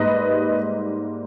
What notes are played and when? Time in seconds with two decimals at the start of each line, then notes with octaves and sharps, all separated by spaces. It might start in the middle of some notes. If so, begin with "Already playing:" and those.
Already playing: G#2 G3 A#3 B4 D#5